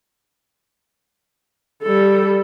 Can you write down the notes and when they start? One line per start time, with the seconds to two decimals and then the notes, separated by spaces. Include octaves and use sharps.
1.83 G3 A4